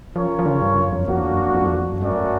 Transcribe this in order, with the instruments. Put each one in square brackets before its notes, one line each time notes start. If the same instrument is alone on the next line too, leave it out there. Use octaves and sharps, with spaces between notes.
[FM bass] F3 [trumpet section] C#4 F4 A#4 C#5
[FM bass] F3
D3
C#3
G2
F#2
F2
[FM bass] F2 [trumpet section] A#3 D4 F#4
[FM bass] E2
F#2
F2
F2
F#2
F2
E2
F2
F#2
[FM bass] G2 [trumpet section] A3 C#4 F#4 A#4 D5
[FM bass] F#2